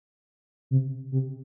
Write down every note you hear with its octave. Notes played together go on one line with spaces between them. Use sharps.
C3
C3